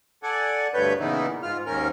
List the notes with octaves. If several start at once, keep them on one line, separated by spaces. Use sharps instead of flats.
A4 D5 F#5 G#5
D2 G2 B4 C#5 G6
A#2 C#3 E3 B3 D#4 E4
G#2 F4 F6
D#2 G#2 D#3 C#4 A#4 F6